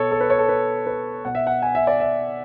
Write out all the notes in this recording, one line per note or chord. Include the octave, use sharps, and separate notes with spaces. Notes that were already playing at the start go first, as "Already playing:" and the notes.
Already playing: B2 A4 C#5
A4
B4
C#5
A4
B4
B4
B2 F#5
E5
F#5
G#5
E5
D5
E5